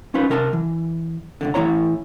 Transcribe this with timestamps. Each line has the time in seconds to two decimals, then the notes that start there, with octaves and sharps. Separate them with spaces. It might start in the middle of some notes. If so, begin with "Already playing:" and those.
0.14 C#4 D#4 F4 B4
0.30 C3 A#4 G#5 A5
0.53 E3
1.41 C#2 B2 D3
1.54 A2 E3 A3 E4 C#5 A#5